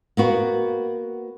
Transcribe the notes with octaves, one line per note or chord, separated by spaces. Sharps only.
A#3 B3 F#4